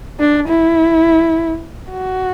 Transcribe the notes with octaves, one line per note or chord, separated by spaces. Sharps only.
D4
E4
F#4